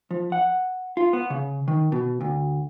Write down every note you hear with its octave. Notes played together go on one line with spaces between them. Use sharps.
F3
F#5
F4
B3
C#3
D#3
B2
D2